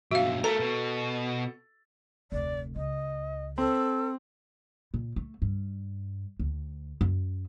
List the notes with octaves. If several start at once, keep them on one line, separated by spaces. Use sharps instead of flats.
B1 G2 F#4 E5 F5
A3 A4 A#4 A#5
B2
F1 D2 D5
C#2 D#5
C4 A4
A#2
A3
G2
D2
F#2